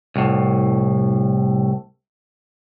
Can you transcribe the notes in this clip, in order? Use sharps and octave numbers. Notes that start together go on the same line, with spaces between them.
C2 A2